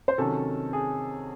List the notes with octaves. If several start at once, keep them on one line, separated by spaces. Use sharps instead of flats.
C5
C3 D#3 F#3 C#4 A4
G#4